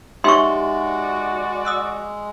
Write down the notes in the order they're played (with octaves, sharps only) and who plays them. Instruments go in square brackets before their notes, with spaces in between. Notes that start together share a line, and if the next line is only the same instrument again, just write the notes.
[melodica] G#3 [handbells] D#4 G4 E5 [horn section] F#4 D5 [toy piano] C6 C#6
[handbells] D#6 E6 F#6